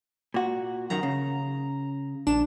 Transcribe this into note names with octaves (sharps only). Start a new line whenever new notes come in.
A#2 F#4
F#2 D#3 F#4 A#5
C#3
A#1 D4 E7